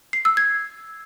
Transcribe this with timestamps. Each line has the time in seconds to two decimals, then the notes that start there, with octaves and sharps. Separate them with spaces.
0.13 C7
0.25 E6
0.37 G#6